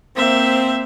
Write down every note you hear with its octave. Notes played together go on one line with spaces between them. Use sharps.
A#3 C4 C5 E5